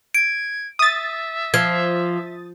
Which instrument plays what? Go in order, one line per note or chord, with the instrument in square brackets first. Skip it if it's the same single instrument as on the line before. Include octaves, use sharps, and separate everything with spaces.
[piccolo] G#6 [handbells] D7
[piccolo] E5 [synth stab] D#6 A6
[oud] F3 [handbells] G#6